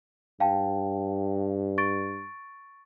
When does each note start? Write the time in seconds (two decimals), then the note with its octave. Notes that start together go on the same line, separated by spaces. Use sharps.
0.40 G2 F5 G5 A5
1.78 C#6 A6 D7